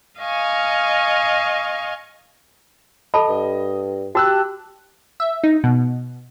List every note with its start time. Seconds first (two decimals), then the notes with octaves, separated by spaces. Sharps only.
0.20 D#5 F5 G#5 C#6
3.14 A4 D#5 A5 B5
3.29 G2
4.15 F#4 G4 A5 E6 F#6
5.20 E5
5.44 D#4
5.64 B2